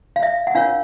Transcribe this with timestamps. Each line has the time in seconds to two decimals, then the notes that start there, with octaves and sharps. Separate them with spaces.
0.16 F5
0.23 E5
0.47 F#5
0.55 D4 F4 A#4 C#5 F5